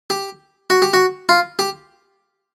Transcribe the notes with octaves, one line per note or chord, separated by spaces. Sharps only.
G4
F#4
G4
F#4
F4
G4